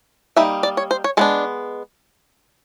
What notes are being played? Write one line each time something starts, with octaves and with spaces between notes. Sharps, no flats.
G3 A#3 D#4 E5
D5
C#5
C5
C#5
G#3 B3 D4 A4